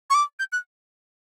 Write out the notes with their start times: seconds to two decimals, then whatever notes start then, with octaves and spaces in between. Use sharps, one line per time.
0.10 C#6
0.14 D6
0.39 G6
0.52 F#6